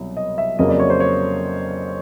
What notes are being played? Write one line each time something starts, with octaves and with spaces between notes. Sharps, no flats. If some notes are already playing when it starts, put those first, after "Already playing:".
Already playing: C2 B2 F#3
D#5
E5
F2 C#3 F#3 A#3 D#5
D5
C#5
C5
C#5